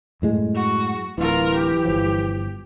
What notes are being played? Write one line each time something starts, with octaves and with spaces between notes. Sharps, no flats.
F#2 A2 G#3
F#4
D1 E3 F4 A#4
G4
G1 F3